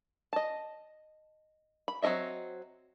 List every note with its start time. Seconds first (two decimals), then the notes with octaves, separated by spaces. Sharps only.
0.33 D#5 A5
1.88 B5
2.02 F#3 C4 A#4 D#5 E5